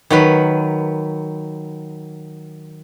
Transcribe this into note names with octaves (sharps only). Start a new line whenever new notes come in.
D#3 F#3 B4